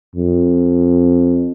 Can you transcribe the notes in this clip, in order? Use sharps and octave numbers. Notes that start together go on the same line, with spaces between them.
F2